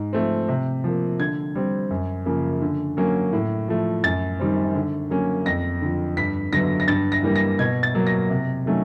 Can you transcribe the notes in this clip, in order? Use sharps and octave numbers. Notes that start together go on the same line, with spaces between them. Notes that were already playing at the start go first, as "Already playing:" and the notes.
Already playing: G#2
F3 A3 C4
C3
F3 A#3
D3 G#6
G3 C4
F#2
C#3 F3 A#3
D3
F#3 A#3 C#4
A2
F3 A3
F#2 A6
D#3 G3 C4
D3
F#3 A#3 C#4
F2 A#6
D3 F3
G2 B6
D3 F#3 B3 A#6
A#6
G2 A6
A#6
E3 G3 A#3
A#6
B2 G#6
A6
F#3 A#3
A#6
C3
D#3 F#3 A3 C#4